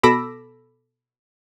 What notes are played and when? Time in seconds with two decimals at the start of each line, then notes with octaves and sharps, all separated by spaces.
0.03 B2 A4 B5 D6 E6 A#6